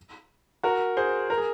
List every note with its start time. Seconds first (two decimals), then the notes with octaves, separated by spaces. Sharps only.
0.63 F#4 A#4
0.97 G#4 C5
1.30 A#4
1.38 G#4